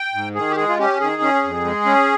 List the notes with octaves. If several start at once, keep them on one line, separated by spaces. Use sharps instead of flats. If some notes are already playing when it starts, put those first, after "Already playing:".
Already playing: G5
G#2
D#3 G#4
G4
G#3 G#4
F4
C#4 G4
D#3 G#4
C#4
F2
G#3
C#4